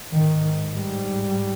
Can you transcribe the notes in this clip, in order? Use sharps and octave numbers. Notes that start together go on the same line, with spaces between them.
G#2 D#3
G3